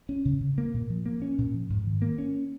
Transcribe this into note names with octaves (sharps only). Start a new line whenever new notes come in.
C#4
C#3
C#3
A#3
A#2
F3
A#3
C#4
A#2
F3
G#2
D#3
A#3
C#4